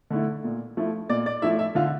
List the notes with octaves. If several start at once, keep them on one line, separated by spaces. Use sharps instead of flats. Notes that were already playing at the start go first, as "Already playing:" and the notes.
D3 A3 E4
A#2
F3 A3 E4
A#2 D5
D5
F3 A3 E4 E5
E5
D3 F4